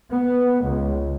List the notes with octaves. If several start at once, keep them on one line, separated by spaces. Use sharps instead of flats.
B3
C#2